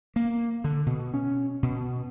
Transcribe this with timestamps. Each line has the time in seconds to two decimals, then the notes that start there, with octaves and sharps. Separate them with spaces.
0.16 A#3
0.64 D3
0.86 B2
1.14 C#4
1.63 B2